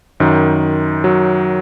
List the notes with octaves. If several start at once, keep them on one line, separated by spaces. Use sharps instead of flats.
F#2 D#3
F#3